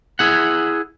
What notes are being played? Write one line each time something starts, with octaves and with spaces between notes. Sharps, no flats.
E4 G#4 F#5